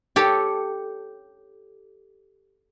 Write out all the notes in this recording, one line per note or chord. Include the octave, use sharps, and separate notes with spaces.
G4 A4 C#5